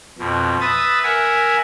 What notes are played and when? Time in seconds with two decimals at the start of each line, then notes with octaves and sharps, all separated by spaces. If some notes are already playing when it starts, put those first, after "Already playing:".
0.18 F2 B2
0.61 B4 E5 D#6 A6
1.03 A#4 E5 F#5 G#5